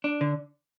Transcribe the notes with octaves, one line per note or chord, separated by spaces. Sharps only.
D4
D3